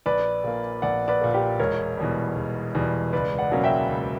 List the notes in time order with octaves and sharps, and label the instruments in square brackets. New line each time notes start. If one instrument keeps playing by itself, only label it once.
[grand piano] A#1 [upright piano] B4 D5
[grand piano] A#2 A#3
[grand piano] A#1 [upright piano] D5 F#5
[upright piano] B4 D5
[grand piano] A#2 A#3
[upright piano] G4 B4
[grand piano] E1 [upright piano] A#4 C#5
[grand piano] E2 B2 G3
E1
E2 B2 G3
[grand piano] C#2 [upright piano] B4 D5
[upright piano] D5 F#5
[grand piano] B2 F#3 A#3 C#4
[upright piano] E5 G5
[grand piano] C#2